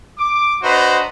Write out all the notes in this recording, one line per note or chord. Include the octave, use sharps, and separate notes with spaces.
D6
D4 F#4 B4 C5 D#5 A#5